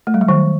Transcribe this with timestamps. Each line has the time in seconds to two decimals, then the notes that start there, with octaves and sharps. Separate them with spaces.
0.07 A3
0.14 G3
0.21 F#3
0.28 D#3